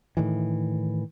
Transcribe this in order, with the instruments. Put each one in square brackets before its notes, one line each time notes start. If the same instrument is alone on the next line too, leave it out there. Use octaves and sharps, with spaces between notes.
[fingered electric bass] A2 D#3 E3